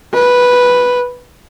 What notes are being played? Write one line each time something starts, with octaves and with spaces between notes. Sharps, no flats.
B4